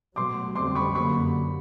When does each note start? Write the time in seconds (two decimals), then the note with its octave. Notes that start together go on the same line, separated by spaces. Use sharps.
0.16 B2 F#3 A3 C6 D6
0.55 F2 D3 G3 C4 C6 D6
0.75 B5 C#6
0.95 F#2 D3 F#3 A#3 B5 C#6